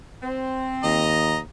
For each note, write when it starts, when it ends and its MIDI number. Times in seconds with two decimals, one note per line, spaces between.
0.22 1.12 60
0.83 1.40 39
0.83 1.38 75
0.83 1.38 82